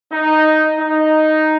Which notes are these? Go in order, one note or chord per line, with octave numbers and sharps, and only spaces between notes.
D#4
D#4